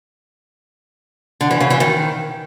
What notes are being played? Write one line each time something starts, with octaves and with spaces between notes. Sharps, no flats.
D3
E3
C#3
E3
D#3